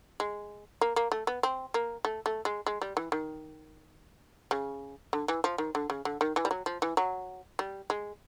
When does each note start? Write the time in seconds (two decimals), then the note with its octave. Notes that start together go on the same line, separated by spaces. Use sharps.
0.20 G#3
0.81 A#3
0.96 A#3
1.12 A3
1.27 B3
1.43 C4
1.74 A#3
2.05 A3
2.26 A3
2.45 G#3
2.66 G#3
2.82 G3
2.97 E3
3.12 D#3
4.51 C#3
5.13 D3
5.28 E3
5.44 F3
5.58 D#3
5.75 D3
5.90 C#3
6.05 D3
6.21 D#3
6.36 E3
6.45 G3
6.51 F#3
6.66 F3
6.82 E3
6.97 F#3
7.59 G3
7.90 G#3